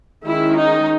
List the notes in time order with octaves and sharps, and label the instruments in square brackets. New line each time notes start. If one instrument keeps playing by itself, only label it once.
[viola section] D#3 G#3 C#4 E4
D#4